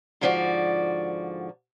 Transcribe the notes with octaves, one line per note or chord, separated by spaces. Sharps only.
G#2 D3 F3 E4 F#4 D5